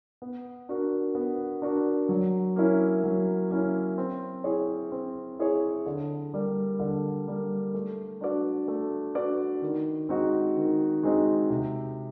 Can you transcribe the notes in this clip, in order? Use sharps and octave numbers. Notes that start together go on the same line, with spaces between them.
B3
D4 F#4 A#4
B3
D4 F#4 A#4
F#3
A#3 C#4 E4
F#3
A#3 C#4 E4
C4
E4 G#4 C#5
C4
E4 G#4 C#5
D3
G3 A#3
D3
G3 A#3
A3
D4 F#4 B4 D5
A3
D4 F#4 B4 D5
D#3
G#3 C4 D#4 F#4
D#3
G#3 C4 D#4 F#4
C3